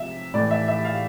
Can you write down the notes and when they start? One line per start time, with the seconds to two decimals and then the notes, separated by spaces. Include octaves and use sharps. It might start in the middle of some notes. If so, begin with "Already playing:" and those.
Already playing: C3 F3 E5
0.34 A2 E3 A3 D5
0.51 E5
0.68 E5
0.85 F5